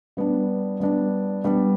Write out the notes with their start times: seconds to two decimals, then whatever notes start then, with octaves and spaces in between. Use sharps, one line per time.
0.17 G3 B3 D4
0.80 G3 B3 D4
1.44 G3 B3 D4